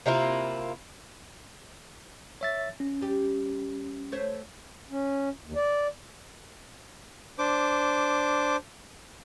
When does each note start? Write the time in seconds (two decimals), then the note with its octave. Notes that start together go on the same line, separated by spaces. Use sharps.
0.06 C3 A#3 E4 F4
2.41 C#5 E5 A6
2.80 C#4
3.01 G3 G4
4.12 A3 C5 C#5
4.91 C#4
5.44 D#2
5.56 D5
7.39 D4 C5 D6